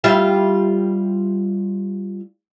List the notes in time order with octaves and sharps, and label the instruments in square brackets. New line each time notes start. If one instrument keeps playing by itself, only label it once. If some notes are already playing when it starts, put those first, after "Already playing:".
[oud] G3 F4 E5